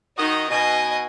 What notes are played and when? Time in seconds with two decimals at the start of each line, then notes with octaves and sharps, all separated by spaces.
0.18 D#3 D#4 F#4 D#5
0.50 B2 D#5 G#5